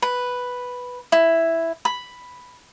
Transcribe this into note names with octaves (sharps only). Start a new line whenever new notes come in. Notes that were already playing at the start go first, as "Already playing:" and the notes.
B4
E4
B5